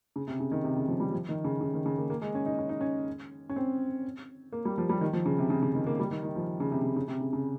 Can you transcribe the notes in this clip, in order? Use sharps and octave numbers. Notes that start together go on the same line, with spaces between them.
C#3
C3
C#3
D#3
C3
C#3
F3
G3
F3
D#3
C#3
C#3
D#3
C#3
A#3
A#3
G#3
C#4
D#4
C#4
D#4
C#4
C#4
C4
A#3
G3
F3
G3
D#3
F3
C#3
C3
C#3
C#3
D#3
A#3
G3
D#3
D#3
F3
C#3
C3
C#3
C#3
C3
C#3
C#3